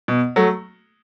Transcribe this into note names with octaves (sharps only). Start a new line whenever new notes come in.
B2
F#3 A3